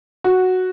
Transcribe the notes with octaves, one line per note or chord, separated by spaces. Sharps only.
F#4